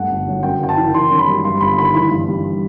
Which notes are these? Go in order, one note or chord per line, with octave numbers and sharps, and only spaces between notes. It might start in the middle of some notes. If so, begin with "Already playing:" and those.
Already playing: G2 A3 F#5
G1
F#3
F#2 G5
F#1 G5
A5
E3
D#3 C6
F#2
B5
G3
G2 C6
G1 B5
D#3 B5
E3 B5
G2
G3